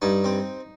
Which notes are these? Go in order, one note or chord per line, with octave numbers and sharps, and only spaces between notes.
G2 D#4
C4